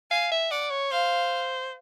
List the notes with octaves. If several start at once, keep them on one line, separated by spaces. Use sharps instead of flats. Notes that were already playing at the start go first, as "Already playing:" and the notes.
F5 G#5
E5
D5 F#5
C#5
C5 F5